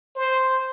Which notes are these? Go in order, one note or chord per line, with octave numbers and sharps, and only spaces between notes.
C5